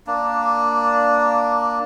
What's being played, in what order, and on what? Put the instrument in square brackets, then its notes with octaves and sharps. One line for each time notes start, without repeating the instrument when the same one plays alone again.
[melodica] A#3 D4